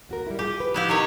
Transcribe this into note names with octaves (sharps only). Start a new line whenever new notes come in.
D#2 F#4 A#4
G3 E4
F4 G4 G#4
B4
F3 B3 E4 G4 F5
C3 D#3 C#5